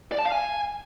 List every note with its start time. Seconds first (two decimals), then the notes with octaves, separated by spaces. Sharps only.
0.12 D5
0.19 A5
0.25 F5
0.32 G#5